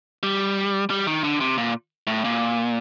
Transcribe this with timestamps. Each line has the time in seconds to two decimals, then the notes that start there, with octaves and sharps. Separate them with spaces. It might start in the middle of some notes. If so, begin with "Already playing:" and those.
0.23 G3
0.90 G3
1.07 D#3
1.24 D3
1.40 C3
1.58 A#2
2.07 A2
2.25 A#2